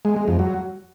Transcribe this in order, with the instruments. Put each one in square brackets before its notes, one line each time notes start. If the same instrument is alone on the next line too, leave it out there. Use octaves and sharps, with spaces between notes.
[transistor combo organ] G#3
G#3
F2
F#3